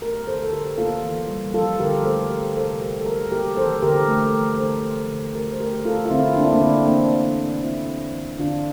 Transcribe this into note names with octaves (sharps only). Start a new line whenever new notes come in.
A3 G4 A#4
A#4
D3 A4 C5
A4
D3 G4 A#4
A#3 F4 A4
E3
G3
F3 F4 A4
D3 G4 A#4
A#4
A3 A4 C5
C5
F3 G4 A#4
C3 A4 C5
C3 G4 A#4
A4
G3 G4 A#4
A#3 G4 A#4
E3 A4 C5
D3 G4 A#4
A3
F3
D3 A4 C5
D3
D3
A3 G4 A#4
C5
A3 G4 A#4
A3 F4 A4
F4
D3 C4 E4
A#3 D4
E4
A#3 D4
D3 C4
E3 A#3 D4
A#3
A#3
A#3 C4 E4
A#3
E3
D3 D4 F4